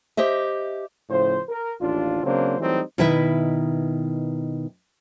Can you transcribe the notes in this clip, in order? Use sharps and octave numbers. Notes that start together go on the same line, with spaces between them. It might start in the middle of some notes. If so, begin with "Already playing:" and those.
G4 C5 D#5 E5
A2 C#3 F3 C5
A#4
A1 D#2 D4 F4
C#3 F#3 A#3 C4 D4 C5
E3 F#3 G3 A3 C4 D#4
B2 D#3 E4 B4 E5